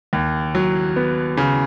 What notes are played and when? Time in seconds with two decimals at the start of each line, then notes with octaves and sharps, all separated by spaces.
0.13 D#2
0.55 F#3
0.96 B3
1.37 C#3